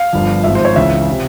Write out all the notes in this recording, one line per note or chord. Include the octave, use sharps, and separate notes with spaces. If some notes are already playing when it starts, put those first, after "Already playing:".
Already playing: F5
G1 G2 F3
G#1 G#2 F3 E5
C5
C#5
C#2 C#3 E3 E5
C3